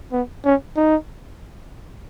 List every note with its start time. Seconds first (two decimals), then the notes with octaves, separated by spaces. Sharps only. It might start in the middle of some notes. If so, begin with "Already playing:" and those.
0.12 B3
0.45 C#4
0.76 D#4